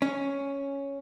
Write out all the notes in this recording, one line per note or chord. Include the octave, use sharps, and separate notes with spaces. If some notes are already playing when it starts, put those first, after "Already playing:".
C#4